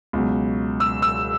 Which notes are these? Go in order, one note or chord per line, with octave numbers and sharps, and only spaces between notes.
C#2 B2 F#3
E6
E6